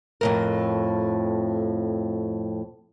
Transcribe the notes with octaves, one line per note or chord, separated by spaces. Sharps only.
F2 A2 A#4